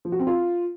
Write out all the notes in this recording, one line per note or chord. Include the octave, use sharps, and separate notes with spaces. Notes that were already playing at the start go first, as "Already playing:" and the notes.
F3
F#4
C4
F4